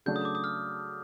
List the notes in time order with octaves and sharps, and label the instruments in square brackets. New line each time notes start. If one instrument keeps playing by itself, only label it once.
[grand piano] C#3 F#3 A3 D4 [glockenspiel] G6
[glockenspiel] D#6
D6
D#6
F6